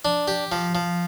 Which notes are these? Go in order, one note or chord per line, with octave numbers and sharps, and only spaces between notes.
D4
G4
F3
F3